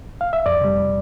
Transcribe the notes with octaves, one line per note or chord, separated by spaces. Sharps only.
F5
E5
F2 D5
C3 G3